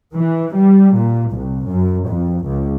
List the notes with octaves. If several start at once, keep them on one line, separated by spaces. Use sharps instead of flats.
E3
G3
A#2
C2
F#2
F2
C#2